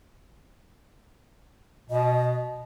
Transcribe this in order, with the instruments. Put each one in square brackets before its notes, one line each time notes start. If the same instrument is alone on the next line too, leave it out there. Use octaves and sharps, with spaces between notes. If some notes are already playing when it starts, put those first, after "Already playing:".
[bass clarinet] B2 [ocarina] D#5